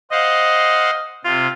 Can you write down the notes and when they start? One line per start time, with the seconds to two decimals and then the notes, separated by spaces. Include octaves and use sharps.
0.11 C5 D#5 F5 F#5
1.25 C3 F4